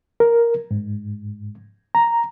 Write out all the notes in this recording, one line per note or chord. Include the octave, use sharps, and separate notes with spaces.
A#4
G#2
A#5